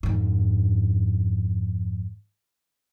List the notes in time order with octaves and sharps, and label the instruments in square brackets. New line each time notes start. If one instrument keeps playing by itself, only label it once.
[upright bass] F2 G#2